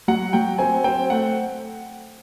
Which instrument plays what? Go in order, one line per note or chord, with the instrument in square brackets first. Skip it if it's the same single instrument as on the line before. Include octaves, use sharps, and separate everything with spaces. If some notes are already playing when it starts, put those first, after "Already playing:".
[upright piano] F#3 [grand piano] F#5
[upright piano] F#3 [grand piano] G5
[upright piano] C4 [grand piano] G#5
[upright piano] C4 [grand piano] G5
[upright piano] A3 [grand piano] F#5